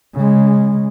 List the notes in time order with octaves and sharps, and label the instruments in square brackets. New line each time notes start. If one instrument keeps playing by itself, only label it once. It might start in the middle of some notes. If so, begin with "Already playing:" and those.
[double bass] C#3 G#3